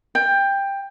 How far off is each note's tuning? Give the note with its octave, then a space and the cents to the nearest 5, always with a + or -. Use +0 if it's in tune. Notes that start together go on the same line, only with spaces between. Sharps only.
G5 +15